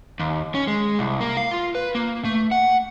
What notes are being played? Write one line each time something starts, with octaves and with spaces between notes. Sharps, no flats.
D#2
C#4
G#3
C2
A#3
F5
F4
B4
A#3
A3
F#5